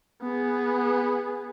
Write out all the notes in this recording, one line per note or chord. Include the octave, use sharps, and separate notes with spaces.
B3 G#4